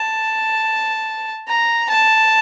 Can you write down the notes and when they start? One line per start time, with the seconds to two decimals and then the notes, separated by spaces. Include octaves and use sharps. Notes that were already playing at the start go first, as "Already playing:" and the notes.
Already playing: A5
1.48 A#5
1.90 A5